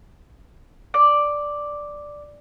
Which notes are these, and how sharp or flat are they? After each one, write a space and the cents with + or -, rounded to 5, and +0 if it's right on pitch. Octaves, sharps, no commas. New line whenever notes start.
D5 +0